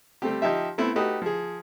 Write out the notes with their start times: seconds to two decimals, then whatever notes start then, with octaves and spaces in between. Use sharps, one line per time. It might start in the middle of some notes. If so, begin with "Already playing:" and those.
0.22 G3 A3 C4 G4
0.42 F3 D#4 G4 E5
0.78 A3 B3 C4 E4
0.96 A3 D#4 F#4 G4 B4 D#6
1.22 F3 G#4